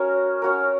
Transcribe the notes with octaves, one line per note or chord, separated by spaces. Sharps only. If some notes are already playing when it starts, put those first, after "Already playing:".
Already playing: C#4 F#4 A#4
C#4 F#4 A#4